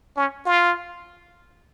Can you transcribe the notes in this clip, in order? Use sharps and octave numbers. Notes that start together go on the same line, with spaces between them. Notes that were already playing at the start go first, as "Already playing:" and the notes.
C#4
F4